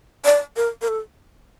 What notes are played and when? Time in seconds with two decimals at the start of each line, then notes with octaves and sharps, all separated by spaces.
0.25 D5
0.56 A#4
0.82 A#4
0.88 A4